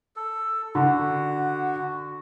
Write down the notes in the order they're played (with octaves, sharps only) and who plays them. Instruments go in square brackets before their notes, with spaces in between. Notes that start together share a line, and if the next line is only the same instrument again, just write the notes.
[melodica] A4
[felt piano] D3 [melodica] F#4